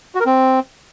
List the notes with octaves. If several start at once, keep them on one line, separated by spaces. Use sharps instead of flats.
F#4
A#4
C4